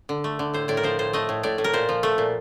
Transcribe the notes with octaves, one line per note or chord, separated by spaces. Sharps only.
D3
A3
D3
A2 C5
A2 D5
A#4
F3 C5
A2 C5
A3 D#5
A2
A2 D5
A2
A#4
A#2 C5
F3
A3
A#2